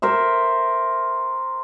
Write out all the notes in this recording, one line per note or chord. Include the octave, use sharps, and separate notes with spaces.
A#4 C5 E5